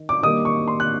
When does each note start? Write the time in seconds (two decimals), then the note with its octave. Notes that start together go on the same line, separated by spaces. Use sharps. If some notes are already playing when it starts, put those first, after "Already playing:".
Already playing: D#3
0.09 D6
0.23 D#3 G3 A#3 D#6
0.45 C#6
0.68 C6
0.80 F#6